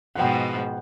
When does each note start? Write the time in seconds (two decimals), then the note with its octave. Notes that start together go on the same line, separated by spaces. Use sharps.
0.15 G#2 B2 F3 F#5 G5